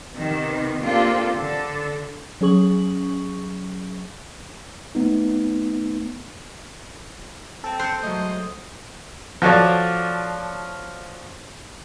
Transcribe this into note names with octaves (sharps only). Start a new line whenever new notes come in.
C3 D#3 B3
A#3 C4 D4 F4 G4 A4
D3 A4
F#3 C#4 G#4 C#6 F#7
A3 B3 D#4
C4 A4
C5 F#6 G6 C#7
F#3 G#3 A3 D#5
F3 F4 F#4 A4 C#5 D5